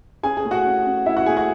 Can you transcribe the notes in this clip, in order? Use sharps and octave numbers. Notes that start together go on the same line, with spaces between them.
C#4 G#4 G#5
G#4 G#5
A3
F#4 F#5
C#4
C#4
C#4 E4 E5
F#4 F#5
A3 G#4 G#5
F#4 F#5